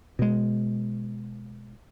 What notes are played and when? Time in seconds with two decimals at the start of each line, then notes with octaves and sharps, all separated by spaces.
0.19 B2 G#3